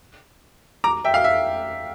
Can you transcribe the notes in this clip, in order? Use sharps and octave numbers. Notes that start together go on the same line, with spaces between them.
A#5 D6
E5 G5
F5
E5